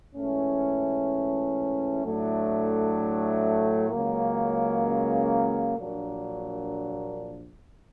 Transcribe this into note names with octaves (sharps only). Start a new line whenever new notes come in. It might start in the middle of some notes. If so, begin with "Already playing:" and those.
G#2 E3 A3 C#4
A2 F#3 A3 D4
C#2 C#3 F#3 A#3
A#1 A#2 F#3 A#3 D4